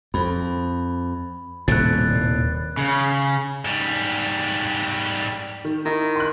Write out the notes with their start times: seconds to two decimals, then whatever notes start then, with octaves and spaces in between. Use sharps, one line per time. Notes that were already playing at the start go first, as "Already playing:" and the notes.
0.14 F2 B5
1.68 D#1 A2 C3 F#6 A6
2.77 C#3
3.65 G#2 G3
5.65 D#3
5.86 D#3 E4
6.16 C6 F#6